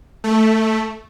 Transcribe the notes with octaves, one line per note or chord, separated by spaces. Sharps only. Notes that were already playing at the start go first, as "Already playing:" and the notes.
A3